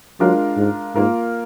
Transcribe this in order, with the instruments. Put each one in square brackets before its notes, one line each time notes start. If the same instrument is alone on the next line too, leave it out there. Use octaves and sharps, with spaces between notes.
[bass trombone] F#3 [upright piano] G#3 D4 F4 A#4
[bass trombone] G#2
[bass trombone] G#2 [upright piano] A#3 F4 A#4